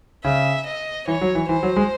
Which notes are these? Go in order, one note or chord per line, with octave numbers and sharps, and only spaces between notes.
C#3 E5
D#5
E3 C#5
F#3
E3
E3 C5
F#3
G#3